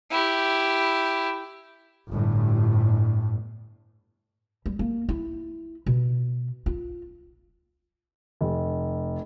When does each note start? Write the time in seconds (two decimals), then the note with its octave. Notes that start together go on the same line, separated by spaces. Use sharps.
0.11 E4 G4
2.10 G1 A2
4.66 G3
4.79 A#3
5.09 E4
5.86 B2
6.66 F4
8.41 F1